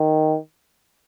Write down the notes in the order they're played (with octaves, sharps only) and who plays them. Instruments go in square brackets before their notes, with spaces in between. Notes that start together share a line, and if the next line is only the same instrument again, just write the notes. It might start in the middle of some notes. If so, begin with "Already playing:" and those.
Already playing: [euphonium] D#3